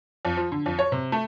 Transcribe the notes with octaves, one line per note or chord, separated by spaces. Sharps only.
F2
F3
D3
F2
C#5
C3
A3